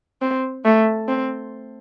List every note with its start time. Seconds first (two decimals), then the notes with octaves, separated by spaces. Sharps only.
0.22 C4
0.65 A3
1.08 C4